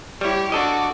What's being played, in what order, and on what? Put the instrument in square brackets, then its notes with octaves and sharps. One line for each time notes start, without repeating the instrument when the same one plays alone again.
[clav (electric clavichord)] G3 E4 [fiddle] G4 C#5
[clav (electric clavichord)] D4 A4 D#5 [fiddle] F#4 D6